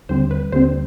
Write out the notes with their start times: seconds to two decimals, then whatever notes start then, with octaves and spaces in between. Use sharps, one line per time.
0.09 D#2 D3 G3 C4 C5
0.31 B4
0.52 D#2 D3 G3 C4 C5